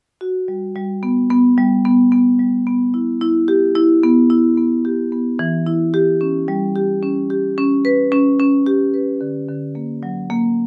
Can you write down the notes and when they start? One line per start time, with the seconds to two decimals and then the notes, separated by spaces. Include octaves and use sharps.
0.21 F#4
0.48 G3
0.76 G3
1.03 B3
1.30 B3
1.58 G3
1.85 B3
2.12 B3
2.39 G3
2.67 B3
2.94 E4
3.21 E4
3.48 G4
3.75 E4
4.03 B3
4.30 E4
4.57 B3
4.85 G4
5.12 B3
5.39 E3
5.67 E4
5.94 G4
6.21 C#4
6.48 G3
6.76 G4
7.03 C#4
7.30 G4
7.58 C#4
7.85 B4
8.12 C#4
8.39 C#4
8.66 G4
8.94 B4
9.21 D3
9.48 D3
9.75 A#3
10.03 F#3
10.30 A#3